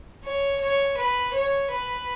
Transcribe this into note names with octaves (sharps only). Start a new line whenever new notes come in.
C#5
C#5
B4
C#5
B4